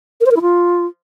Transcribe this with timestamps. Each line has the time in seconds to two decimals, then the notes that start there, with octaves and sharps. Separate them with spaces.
0.21 A#4
0.26 C5
0.31 A#4
0.36 E4
0.42 F4